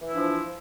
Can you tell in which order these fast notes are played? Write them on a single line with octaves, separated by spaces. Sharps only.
E3 E4 D4 F3